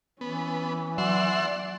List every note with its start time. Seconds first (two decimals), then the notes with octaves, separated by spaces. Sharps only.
0.21 E3 B3 C#4
0.98 F#3 D5 E5 F#5 C6